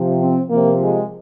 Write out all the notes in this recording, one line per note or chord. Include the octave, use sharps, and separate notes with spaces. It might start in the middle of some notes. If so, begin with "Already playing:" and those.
Already playing: C3 F3
C4
C3 F3 A#3
G#3